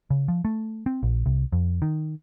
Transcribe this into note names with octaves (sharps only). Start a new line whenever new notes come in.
C#3
F3
A3
C4
A#1
C2
F2
D#3